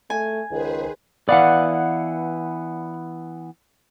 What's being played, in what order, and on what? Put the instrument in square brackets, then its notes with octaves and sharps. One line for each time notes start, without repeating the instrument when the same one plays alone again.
[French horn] A3 [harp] G#5
[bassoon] C#2 [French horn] D#3 [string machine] G#4 B4 C5
[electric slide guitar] E3 B3 [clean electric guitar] D5 F5 F#5